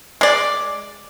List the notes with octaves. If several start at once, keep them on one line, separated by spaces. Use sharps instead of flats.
G#3 D5